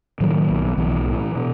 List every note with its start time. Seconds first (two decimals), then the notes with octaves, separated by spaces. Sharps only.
0.20 A2 D#3 F#3
0.49 B1
0.78 B1 E3
1.07 A2
1.35 B2